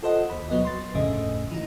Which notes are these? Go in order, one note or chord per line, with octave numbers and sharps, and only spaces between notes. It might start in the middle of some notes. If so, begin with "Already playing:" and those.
F4 A4 C5 D#5 F#5
D#2 B5
B2 F#3 B3 D#5
C6 A6
G1 F2 A2 C#3 A3 D#5
E3 D#4